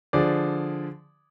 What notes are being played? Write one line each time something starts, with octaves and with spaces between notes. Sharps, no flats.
D3 F3 G#4 D5